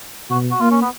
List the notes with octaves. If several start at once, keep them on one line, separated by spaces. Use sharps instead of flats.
B2 F#4
F#4
A#3 F4
C#4
B3